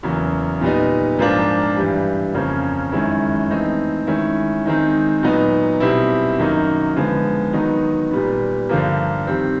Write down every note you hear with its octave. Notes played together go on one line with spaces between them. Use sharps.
E2 C#3 F#3 A#3
A#2 G3 B3 D#4
G#2 F3 A#3 D4 F4
G2 E3 G3
F2 C#3 F3 A#3 C#4
F#2 D#3 G#3 C#4 E4
E3 A3 C4 D#4
D#3 G#3 C#4 E4
D#3 G#3 C4 D#4
A#2 F#3 B3 D#4
B2 G3 C4 E4
F#2 D#3 F#3 A#3 D#4
D3 F3 G#3 B3
D#3 F#3 B3 D#4
A#2 G3 B3
G2 D3 F3 A#3
D#3 G3 C4